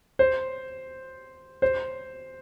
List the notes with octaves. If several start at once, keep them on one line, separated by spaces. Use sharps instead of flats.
C5
C5